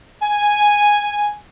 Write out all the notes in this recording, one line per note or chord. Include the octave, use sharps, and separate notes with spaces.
G#5